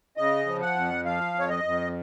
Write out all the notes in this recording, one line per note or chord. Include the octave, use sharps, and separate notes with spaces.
C#3 D#5
F3
F#5
F2
F3 F5
F2
C#5
D#5
F2